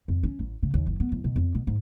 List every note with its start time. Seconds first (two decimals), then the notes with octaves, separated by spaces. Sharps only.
0.08 F2
0.23 C#4
0.39 A1
0.63 C#3
0.74 D#2
0.87 F#1
1.00 B3
1.12 D1
1.24 B2
1.36 F2
1.55 B2
1.67 G#2